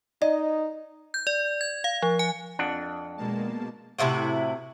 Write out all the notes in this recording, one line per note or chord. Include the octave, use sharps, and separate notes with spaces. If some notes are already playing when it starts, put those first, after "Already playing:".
D#4 D5 D#5
G6
D5
G#6
F5
F3
G#5
F2 D4 F#5
B2 G#3 A#3 A5
A2 C3 E4 F#4